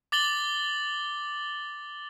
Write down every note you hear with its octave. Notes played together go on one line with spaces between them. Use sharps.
D6 A6 F#7 G7